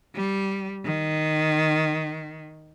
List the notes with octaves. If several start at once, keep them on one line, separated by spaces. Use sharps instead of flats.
G3
D#3